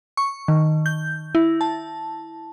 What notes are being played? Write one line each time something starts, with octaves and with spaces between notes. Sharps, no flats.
C#6
D#3
G6
E4
A5